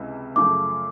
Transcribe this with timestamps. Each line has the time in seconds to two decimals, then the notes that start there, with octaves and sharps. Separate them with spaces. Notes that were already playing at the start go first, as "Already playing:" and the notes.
Already playing: C#2 C3 E3
0.36 F#2 C#3 F3 A3 D6